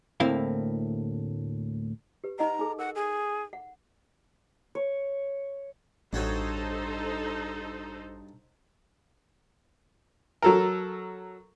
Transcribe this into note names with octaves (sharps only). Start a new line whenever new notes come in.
D2 A2 A#3 C4 E4 F5
G4 B4
D#4 D#5 F#5 A#5
D#4 G#4 A4
A#4 F#5
G#4
F#5
C#5
A1 G2 D#4 F#4 A4 C5 C#5
F#3 A4 A#4